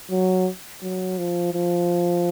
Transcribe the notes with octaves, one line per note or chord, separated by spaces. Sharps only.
F#3
F#3
F3
F3